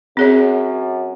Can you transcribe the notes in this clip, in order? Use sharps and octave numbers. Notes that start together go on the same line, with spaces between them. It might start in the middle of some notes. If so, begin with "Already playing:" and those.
F#2 C4 G#4 C#5